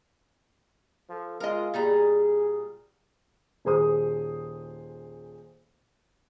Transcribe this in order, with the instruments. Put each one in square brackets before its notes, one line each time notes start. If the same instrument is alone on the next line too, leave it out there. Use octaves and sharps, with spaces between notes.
[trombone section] F3 A4
[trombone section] G#3 F4 [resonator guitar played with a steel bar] A#4 D#5
[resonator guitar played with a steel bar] A#2 G3 A#5 [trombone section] G#4
[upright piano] D#1 G#4 C5 D#6